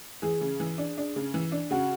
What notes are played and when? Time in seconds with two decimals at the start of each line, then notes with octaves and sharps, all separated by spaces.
0.22 E3 G#4
0.41 C#3
0.60 E3
0.78 D4
0.98 D4
1.16 C#3
1.34 E3
1.52 D4
1.71 C#3 F#4